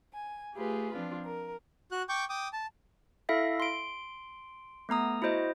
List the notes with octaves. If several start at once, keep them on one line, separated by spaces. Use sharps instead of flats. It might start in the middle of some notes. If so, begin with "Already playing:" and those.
G#5
A3 F4 G4 G#4 B4
F3 C4 D4 F4
A#4
F#4 F#6
G5 C#6 D6 G6
G5 D6 D#6
A5
E4 A4 E5 F5 A#6
C6 D7
A3 B3 A#5 D#6
E4 F#4 C5 D#5